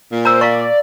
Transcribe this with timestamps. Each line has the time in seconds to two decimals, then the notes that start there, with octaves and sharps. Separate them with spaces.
0.12 A#2
0.25 C5 A#5 E6
0.41 D5 F5 A#5 C#6